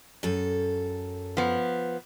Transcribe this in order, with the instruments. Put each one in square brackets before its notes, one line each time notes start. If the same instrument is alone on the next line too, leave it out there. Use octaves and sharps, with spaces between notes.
[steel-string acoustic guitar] F#2 A4
[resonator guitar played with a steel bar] F3 B3